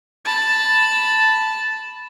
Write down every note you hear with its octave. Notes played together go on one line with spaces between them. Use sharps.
A5 B5